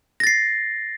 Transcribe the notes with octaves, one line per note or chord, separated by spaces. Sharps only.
A6 A#6 C7